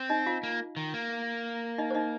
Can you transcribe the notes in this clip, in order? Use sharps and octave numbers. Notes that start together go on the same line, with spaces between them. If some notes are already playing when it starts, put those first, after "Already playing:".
Already playing: C4
D#4 D#5
F4 F5
A#3
D#3
A#3
D#4 D#5
C5
D#4 D#5